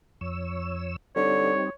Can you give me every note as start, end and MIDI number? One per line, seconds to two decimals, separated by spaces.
0.21 0.96 41
0.21 0.96 73
0.21 0.96 88
1.16 1.53 50
1.16 1.70 55
1.16 1.70 60
1.16 1.70 63
1.16 1.72 73